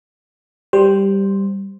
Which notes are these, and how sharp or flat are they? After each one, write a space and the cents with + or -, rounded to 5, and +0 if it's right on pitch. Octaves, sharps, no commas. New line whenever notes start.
G3 +0 C5 +0